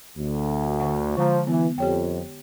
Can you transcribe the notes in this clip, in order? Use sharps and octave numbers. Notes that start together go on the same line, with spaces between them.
D2
D3 F#5
D3 F3 G#3 A#5
E3 B3
F2 G4 C#5 G5